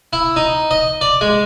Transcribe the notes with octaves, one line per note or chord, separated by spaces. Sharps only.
E4
D#4
D#5
D5
G#3